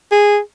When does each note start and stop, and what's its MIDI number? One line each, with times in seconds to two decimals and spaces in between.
0.12 0.38 68